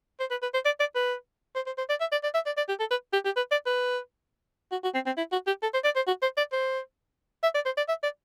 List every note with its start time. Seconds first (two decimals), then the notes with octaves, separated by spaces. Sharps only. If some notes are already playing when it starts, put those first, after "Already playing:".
0.20 C5
0.30 B4
0.42 B4
0.54 C5
0.65 D5
0.80 D5
0.95 B4
1.55 C5
1.66 C5
1.78 C5
1.89 D5
2.00 E5
2.12 D5
2.23 D5
2.34 E5
2.46 D5
2.57 D5
2.68 G4
2.79 A4
2.90 B4
3.13 G4
3.25 G4
3.36 B4
3.51 D5
3.66 B4
4.72 F#4
4.83 F#4
4.94 C4
5.06 C4
5.17 E4
5.32 F#4
5.47 G4
5.62 A4
5.73 C5
5.84 D5
5.96 C5
6.07 F#4
6.22 C5
6.37 D5
6.52 C5
7.43 E5
7.54 D5
7.65 C5
7.77 D5
7.89 E5
8.03 D5